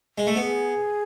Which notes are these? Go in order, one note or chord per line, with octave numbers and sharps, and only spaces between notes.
G#3
A3
B3 G#4